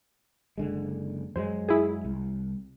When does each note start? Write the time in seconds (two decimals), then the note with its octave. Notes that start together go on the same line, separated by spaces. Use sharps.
0.58 F#1 D3 G#3
1.36 F#2 F#3 G#3 C5
1.69 E4 G#4
2.04 C2